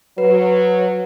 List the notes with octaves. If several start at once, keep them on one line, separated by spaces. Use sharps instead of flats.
F#3 B4